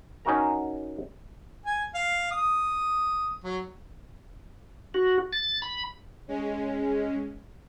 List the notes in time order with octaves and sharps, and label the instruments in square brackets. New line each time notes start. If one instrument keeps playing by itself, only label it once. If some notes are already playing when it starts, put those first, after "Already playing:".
[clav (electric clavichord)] C#4 D#4 F#4 A#4 A#5
[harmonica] G#5
F5
D#6
F#3
[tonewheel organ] F#4
A6
B5
[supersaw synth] G#3 C#4